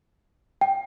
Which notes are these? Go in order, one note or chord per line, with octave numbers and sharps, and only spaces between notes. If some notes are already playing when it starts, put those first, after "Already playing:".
G5